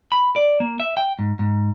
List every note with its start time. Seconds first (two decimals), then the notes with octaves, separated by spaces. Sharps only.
0.12 B5
0.36 D5
0.60 A#3
0.80 E5
0.97 G5
1.19 G#2
1.39 G#2